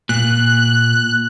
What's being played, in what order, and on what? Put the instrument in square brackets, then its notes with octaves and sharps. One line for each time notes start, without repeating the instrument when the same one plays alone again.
[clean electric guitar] A#2 [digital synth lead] F#6